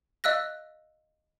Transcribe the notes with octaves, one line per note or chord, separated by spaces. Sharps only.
D#5 F5 E6 F#6 A#6